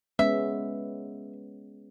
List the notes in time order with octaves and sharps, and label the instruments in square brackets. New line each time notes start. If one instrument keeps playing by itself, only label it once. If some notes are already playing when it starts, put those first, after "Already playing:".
[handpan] G#3 B3 C#4 [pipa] E5